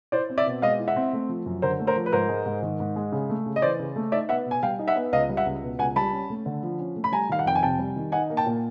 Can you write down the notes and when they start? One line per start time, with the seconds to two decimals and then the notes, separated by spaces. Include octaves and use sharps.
0.12 E4 C5 D5
0.30 C4
0.38 D5 E5
0.47 B2
0.62 G#3 D#5 F5
0.79 E4
0.88 E5 F#5
0.96 C4
1.13 A3
1.29 F3
1.46 F#2
1.62 D3 A#4 C5
1.79 A3
1.87 A#4 C5
1.96 F3
2.06 B4
2.12 G#2 A#4 C5
2.29 G#3
2.46 G#2
2.62 D#3
2.80 G#2
2.96 G#3
3.12 C#3
3.29 A3
3.46 C#3
3.56 D#5
3.62 E3 C5 D5
3.79 C#3
3.96 A3
4.12 D#4 D5 E5
4.29 B3 E5 F#5
4.46 B2
4.51 G#5
4.63 G3 F5 G5
4.79 D#4
4.88 E5 F#5
4.96 B3
5.13 C#2 D#5 F5
5.29 G3
5.37 E5 F#5
5.46 C#2
5.63 B2
5.79 C#2 F#5 G#5
5.96 G3 A5 B5
6.12 C#4
6.30 A3
6.46 D3
6.63 F3
6.79 C#4
6.96 A3
7.04 B5
7.12 G3 G#5 A#5
7.29 D#3 F5
7.39 F#5
7.46 F2 G5
7.55 G#5
7.63 C3 G5 A5
7.79 G3
7.96 D#3
8.12 D#4 F#5 G#5
8.30 A#3
8.37 G5 A5
8.46 A#2